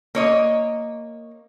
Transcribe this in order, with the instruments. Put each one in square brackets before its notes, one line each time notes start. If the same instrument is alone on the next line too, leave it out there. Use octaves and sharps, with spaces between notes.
[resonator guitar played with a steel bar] A#3 C#5 D#5